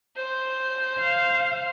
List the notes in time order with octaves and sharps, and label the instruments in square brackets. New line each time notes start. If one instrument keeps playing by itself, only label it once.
[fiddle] C5 C6 [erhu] G6
[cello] F5